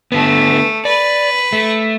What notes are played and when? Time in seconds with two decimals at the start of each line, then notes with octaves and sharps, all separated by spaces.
0.12 D3 A3 B3
0.85 B4 D5
1.53 A3